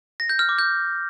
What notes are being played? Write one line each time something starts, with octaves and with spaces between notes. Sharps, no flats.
A#6
G6
F6
D6
G6